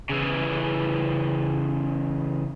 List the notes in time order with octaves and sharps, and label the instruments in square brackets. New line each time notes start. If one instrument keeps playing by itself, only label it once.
[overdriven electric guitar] C#3 E3